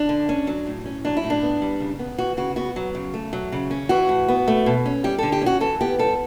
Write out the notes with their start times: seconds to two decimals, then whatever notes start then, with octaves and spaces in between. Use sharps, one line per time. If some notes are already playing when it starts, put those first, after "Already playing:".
Already playing: D4
0.09 D3
0.29 C#4
0.47 F#3
0.67 A2
0.86 C#4
1.05 F#3 D4
1.17 E4
1.24 A2
1.30 D4
1.42 B3
1.62 G3
1.80 C#3
1.99 B3
2.18 E3 F#4
2.37 C#3 F#4
2.56 B3 F#4
2.76 F#3
2.95 C#3
3.14 A3
3.33 F#3
3.52 C#3
3.71 C#4
3.89 E3 F#4
4.09 A2
4.28 B3
4.48 A3
4.66 B2
4.86 C#4
5.04 G3 G4
5.18 D3 A4
5.32 G4
5.41 C#4 F#4
5.61 E3 A4
5.81 B3 G4
5.99 G3 A4